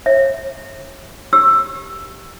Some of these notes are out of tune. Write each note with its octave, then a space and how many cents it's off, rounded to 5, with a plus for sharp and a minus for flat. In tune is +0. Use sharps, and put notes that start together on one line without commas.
C#5 -35 E5 +0
G4 +5 E6 +10